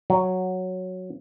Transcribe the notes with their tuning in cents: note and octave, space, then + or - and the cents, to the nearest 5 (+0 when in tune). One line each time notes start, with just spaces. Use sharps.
F#3 -5